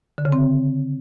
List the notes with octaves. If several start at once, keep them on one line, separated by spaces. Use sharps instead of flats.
D3
C#3
C4